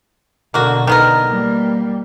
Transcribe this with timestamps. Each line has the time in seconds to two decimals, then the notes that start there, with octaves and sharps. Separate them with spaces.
0.54 B2 D3 A#3 F#4
0.87 D3 D#3 B3 A#4
1.26 G3 A#3